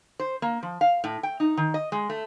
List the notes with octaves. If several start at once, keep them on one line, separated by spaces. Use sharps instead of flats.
C5
A#3
F3
F5
A2
G5
D#4
D#3
D#5
G#3
A3